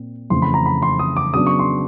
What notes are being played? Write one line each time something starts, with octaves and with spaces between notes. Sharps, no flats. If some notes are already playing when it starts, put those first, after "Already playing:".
Already playing: A#2 C4
F2 C#3 E3 A3 C6
B5
A#5
B5
C6
D#6
D6
C#3 F#3 B3 D4 D#6
C#6
C6